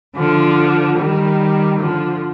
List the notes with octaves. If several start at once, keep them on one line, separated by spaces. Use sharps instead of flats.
D3 F3
D#3 G3
D3 F3